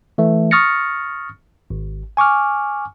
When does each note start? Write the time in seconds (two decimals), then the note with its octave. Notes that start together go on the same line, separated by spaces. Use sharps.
0.18 E3 A3
0.51 C#6 D#6 F6 A6 A#6 C#7
1.70 G#1
2.17 G#5 C#6 D6 F6